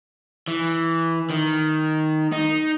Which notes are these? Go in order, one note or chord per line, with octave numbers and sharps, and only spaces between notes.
E3
D#3
D#4